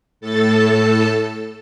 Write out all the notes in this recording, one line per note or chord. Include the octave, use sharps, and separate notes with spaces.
A2 A4 A5